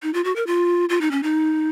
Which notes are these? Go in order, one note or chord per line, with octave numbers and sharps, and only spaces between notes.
D#4
F4
F#4
A#4
F4
F4
D#4
C#4
D#4